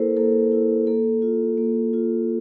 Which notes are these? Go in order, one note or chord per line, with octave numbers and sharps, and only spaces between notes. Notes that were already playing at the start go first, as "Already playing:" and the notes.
Already playing: A#3 E4 A4 A#4 C5
A#3 A4
E4
A#3 A4
F4
A#3
F4